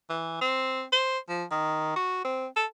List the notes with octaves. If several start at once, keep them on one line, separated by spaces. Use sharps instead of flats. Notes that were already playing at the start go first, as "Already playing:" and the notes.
E3
C4
C5
F3
D#3
F#4
C4
A4